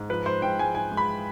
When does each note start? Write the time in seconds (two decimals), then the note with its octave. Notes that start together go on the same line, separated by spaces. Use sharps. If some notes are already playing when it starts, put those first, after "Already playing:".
Already playing: G#2
0.10 F3 B4
0.26 G#2 C5
0.42 G#2 G5
0.59 G#3 G#5
0.75 G#2 G#5
0.92 G#3
0.97 B5